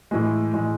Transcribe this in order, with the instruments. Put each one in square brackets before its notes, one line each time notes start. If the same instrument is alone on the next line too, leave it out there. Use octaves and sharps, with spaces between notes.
[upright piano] A2 E3 G#3
A2 E3 G#3